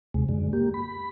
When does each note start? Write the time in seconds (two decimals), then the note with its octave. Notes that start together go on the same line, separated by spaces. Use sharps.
0.14 D#2 C3 G#3
0.29 F#2 D3 G#3
0.53 A#3 G4
0.74 B5